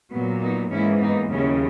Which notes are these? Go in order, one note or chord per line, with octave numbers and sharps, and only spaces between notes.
A#2 F#3 A#3 B3
B3 D#4
G#2 E3 A#3 C#4 E4
B3 D#4
D#2 C#3 F#3 C#4 E4